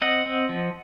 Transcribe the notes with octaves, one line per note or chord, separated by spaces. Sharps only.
C4 D#5 F#5
C4
F3